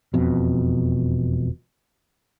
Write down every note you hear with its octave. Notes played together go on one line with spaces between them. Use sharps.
E1 F2 B2